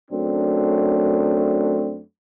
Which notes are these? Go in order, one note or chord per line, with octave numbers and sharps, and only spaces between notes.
F#2 A3 C4 D4